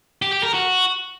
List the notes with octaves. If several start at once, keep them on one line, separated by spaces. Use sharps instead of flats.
G4
G4
A#4
F#4